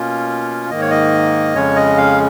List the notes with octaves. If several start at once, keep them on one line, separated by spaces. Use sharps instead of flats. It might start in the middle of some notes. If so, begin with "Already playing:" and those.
Already playing: B2 A#3 C#4 F4
G#2 D#3 A#3 D#5
C#5
D#5
F2 C#3 G#3 C#4 C#5
D#5
F5